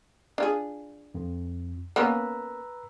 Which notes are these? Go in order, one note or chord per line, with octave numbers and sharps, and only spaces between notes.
D4 F4 G#4
F2
A#3 B3 C#4 B4 A#5 E6